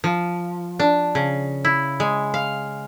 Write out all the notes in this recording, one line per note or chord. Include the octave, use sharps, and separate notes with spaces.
F3
D4
C#3
E4
G#3
F5